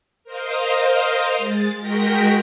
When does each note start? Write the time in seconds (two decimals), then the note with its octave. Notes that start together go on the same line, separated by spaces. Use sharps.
0.24 A#4 C5 D#5 F5
1.38 G#3 A6
1.78 G#3 F#4 A#4 G5 A#6 B6